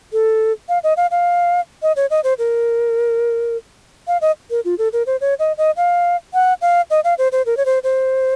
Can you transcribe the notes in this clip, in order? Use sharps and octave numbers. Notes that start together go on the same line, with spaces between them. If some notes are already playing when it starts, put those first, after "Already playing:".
A4
F5
D#5
F5
F5
D#5
C#5
D#5
C5
A#4
F5
D#5
A#4
F4
A4
A#4
C5
C#5
D#5
D#5
F5
F#5
F5
D#5
F5
C5
C5
A#4
C#5
C5
C5